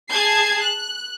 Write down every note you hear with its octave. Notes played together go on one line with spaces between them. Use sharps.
G#4 A5 G#6 C7
F#6